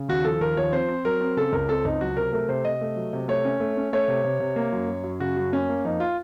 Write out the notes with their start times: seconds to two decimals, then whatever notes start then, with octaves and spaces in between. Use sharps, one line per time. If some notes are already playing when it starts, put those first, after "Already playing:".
Already playing: C#3
0.08 D#2 F#4
0.25 F3 A4
0.41 D#2 A#4
0.57 F3 C#5
0.72 C4 C5
0.88 C4
1.05 F#3 A#4
1.21 C4
1.37 C#3 A4
1.53 C#2 A#4
1.69 C4 A4
1.85 C#2 D#4
2.01 F#3 F#4
2.17 C3 A#4
2.33 A3 A#4
2.49 C3 C5
2.65 C3 D#5
2.81 A3
2.96 F#3
3.13 C3
3.28 A3 C#5
3.45 C#4
3.60 A3
3.77 C#4
3.93 A3 C#5
4.08 C3
4.24 C3
4.40 C3
4.56 A#3
4.72 F#2
4.88 F#3
5.04 F#2
5.20 C#3 F#4
5.37 F#2
5.53 A#3 C#4
5.69 A#3
5.85 F2 D#4
6.00 F4